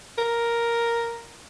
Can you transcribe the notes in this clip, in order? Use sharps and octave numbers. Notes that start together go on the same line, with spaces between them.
A#4